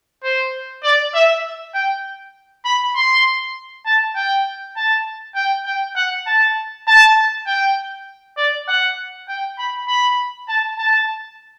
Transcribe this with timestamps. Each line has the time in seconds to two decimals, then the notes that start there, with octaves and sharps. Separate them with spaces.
0.24 C5
0.83 D5
1.15 E5
1.74 G5
2.65 B5
2.95 C6
3.86 A5
4.15 G5
4.76 A5
5.35 G5
5.66 G5
5.96 F#5
6.27 A5
6.87 A5
7.47 G5
8.37 D5
8.68 F#5
9.29 G5
9.58 B5
9.88 B5
10.48 A5
10.79 A5